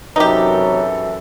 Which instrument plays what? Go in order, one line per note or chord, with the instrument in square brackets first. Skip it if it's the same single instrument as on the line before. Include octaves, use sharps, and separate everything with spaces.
[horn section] F#2 E3 A4 [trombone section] C3 F#3 A#4 [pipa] D#4 G4